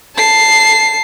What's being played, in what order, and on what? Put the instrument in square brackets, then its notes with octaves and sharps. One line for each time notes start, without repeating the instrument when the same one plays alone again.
[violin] A5 C7